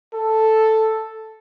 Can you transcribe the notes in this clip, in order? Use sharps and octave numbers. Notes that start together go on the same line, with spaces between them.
A4